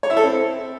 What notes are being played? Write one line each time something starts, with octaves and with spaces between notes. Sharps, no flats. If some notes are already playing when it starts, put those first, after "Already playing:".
C#5
E4
A4
C4